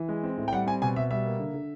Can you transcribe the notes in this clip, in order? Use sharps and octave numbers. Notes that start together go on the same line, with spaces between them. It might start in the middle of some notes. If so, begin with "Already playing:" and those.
Already playing: E3
G#3
C4
A2
G5
G3 F#5
C4 G#5
B2 G#5
B2 E5
G3 E5
A#3
D3
D3